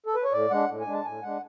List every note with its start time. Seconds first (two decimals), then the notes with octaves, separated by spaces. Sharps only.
0.06 A4
0.15 B4
0.24 C#5
0.32 A2 D5
0.50 G#3 D4 F#5
0.69 A2
0.81 G#5
0.87 G#3 D4
0.93 A5
1.05 A2 G#5
1.22 G#3 D4 F#5